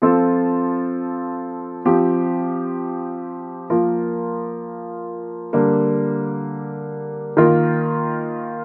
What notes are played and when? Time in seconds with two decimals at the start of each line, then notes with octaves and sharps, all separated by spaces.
0.02 F3 C4 F4 A4
1.85 F3 C4 G4
3.70 F3 A#3 F4 A#4
5.53 D3 G3 A#3
7.37 D#3 A#3 F4 A#4